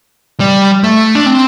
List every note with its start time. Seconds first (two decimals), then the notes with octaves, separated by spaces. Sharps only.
0.40 G3
0.84 A3
1.15 D4
1.26 C4